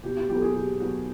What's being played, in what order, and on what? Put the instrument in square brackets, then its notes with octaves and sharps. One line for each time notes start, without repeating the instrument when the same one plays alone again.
[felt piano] B2 G4
G4
F#3 B3 G4
A4
G#4
B2 G4
F#3 B3 F#4